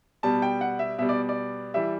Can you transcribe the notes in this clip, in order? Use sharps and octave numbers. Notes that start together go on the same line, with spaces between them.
B2 G3 A5
G5
F#5
E5
B2 G3 E5
D5
D5
E3 G3 E5